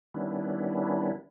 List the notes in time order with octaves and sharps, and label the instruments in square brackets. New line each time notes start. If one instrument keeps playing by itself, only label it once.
[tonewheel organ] D#3 G3 B3 C#4 D4 E4